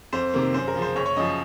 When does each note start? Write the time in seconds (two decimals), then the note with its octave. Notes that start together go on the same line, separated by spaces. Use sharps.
0.13 F2 C5
0.34 C3 D#3 A#3
0.54 F#2 C5
0.67 A#4
0.75 C#3 F3
0.82 C5
0.96 F#1 C#5
1.06 C#5
1.16 F#2 F3 D#5